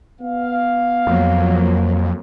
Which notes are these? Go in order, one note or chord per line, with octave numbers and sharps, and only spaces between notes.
B3 F5
F2 F3 F#3 A#3